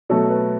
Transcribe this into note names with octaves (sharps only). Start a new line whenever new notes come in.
B2 F#3 A3 A4 C#5
B4